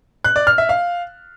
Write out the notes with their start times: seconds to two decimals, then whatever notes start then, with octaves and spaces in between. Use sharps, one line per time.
0.24 F#6
0.36 D5
0.47 F6
0.58 E5
0.69 F5